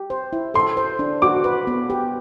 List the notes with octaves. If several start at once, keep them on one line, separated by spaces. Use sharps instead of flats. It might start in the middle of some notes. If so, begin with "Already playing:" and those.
Already playing: G4
C5
E4
A4 C6
C5
D4
F#4 D6
B4
B3
G4